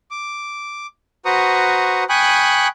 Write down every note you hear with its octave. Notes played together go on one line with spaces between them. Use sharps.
D6
F#4 B4 C5 A#5 C#6 D#6
G5 G#5 B5 C#6 D#6 F#6